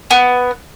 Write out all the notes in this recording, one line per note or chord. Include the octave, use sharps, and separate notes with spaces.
B3